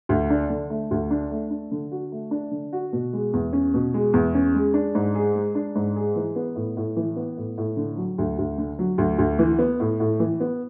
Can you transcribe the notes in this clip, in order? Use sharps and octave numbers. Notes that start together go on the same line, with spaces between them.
D2
D4
D3
A3
D2
D4
A3
D4
D3
F#4
A3
D4
D3
F#4
B2
G#3
E2
C#4
B2
G#3
E2
C#4
G#3
D4
G#2
G#4
G#3
D4
G#2
G#4
E3
B3
A2
A2
E3
B3
A2
A2
D3
F#3
D2
D2
D3
F#3
D2
D2
E3
B3
A2
A2
E3
B3